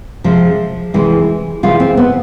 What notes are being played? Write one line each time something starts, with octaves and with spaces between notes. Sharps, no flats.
C3 F3 G#3
C3 E3 G#3
C3 E3 G#3 F4
C4
B3